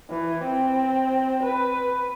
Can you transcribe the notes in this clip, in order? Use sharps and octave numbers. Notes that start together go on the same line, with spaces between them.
E3
C4
B4